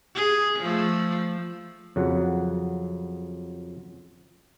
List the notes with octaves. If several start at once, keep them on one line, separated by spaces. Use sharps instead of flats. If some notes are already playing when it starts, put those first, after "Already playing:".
G#4
F3 A3
F2 C#3 F#3 F#5